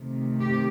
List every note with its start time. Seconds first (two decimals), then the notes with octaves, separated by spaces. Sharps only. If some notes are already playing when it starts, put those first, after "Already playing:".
Already playing: C3 D#3 A3
0.40 G4